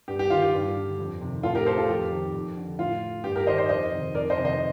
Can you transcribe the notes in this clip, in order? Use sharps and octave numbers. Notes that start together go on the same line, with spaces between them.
G2 G4
G4
D#3 F4
G4
G2
D3
F2
C3 D#3
A2 F4 A4
G4 A#4
A4 C5
F4 A4
F2 G4
D#3
F2
D3
A2 F4
G2 G4
G4 A#4
D#3 C5 D#5
C5 D#5
F2 C5 D#5
C3 D#3
F2 A#4 D5
C5 D#5
C3 D#3
C5 D#5